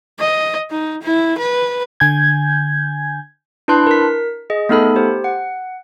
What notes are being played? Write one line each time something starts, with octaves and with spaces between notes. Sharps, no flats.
D#5
D#4
E4
B4
D3 G#5 G6 G#6
D4 E4 B4 A5 C6 F#6
A#4 B6
G#4 D#5
A3 B3 D#4 A4 B5
G4 C5
F#5